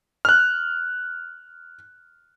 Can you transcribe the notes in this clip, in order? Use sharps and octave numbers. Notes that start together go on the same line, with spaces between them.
F6 F#6